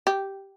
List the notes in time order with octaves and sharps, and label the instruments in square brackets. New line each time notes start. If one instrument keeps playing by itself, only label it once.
[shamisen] G4